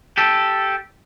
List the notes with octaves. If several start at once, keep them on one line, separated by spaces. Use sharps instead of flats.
G4 A4